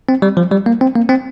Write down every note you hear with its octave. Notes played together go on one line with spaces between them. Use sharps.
C4
G3
F3
G3
A#3
C4
A#3
C4